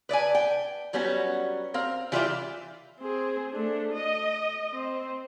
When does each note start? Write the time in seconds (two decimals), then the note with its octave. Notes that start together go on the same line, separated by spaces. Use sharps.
0.09 B4 D5 D#5 G#5
0.35 G5
0.93 F#3 G3 B3 C#4 F#4
1.74 C4 A#4 F5
2.12 E3 G3 F4 D5 E5 G5
3.00 C4 G#4
3.52 A3 D4
3.93 D#5
4.73 C4